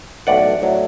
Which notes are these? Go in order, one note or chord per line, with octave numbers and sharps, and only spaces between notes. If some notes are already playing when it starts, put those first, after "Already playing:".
B1 A2 E3 D5 F#5
A2 F#3 A3 D4